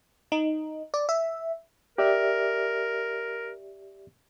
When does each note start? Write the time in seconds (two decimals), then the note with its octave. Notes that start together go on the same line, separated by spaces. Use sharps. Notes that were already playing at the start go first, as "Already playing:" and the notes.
0.32 D#4
0.94 D5
1.09 E5
1.98 G4 A#4 D5 E5